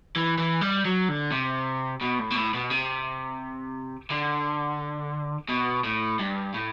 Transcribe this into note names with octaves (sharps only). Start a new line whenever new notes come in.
E3
E3
G3
F#3
D3
C3
B2
A2
B2
A2
B2
C3
D3
B2
A2
G2
A2